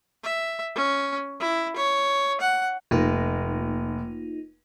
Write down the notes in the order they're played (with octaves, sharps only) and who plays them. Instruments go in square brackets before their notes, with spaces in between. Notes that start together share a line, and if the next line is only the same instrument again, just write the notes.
[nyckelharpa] E5
C#4
E4
C#5
F#5
[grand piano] F1 [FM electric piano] A#3 D#4 F4